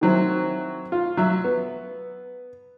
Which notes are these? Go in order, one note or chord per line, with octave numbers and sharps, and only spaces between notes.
D#3 F#3 C4 E4
F4
F#3 E5
B3